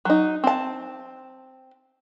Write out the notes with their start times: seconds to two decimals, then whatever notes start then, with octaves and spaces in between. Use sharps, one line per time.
0.05 F#3 D#4
0.44 C4 A5